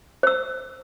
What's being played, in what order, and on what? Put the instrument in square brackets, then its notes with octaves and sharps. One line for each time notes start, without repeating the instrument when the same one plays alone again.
[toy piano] C5 E6